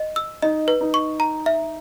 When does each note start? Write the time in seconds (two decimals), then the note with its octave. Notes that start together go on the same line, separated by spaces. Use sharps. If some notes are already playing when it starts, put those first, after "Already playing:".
Already playing: D#5
0.16 E6
0.42 D#4 D#5
0.68 B4
0.81 D#4
0.94 C#6
1.20 A#5
1.46 E5